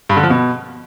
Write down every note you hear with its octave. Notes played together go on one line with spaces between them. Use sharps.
G2
D3
F3
B2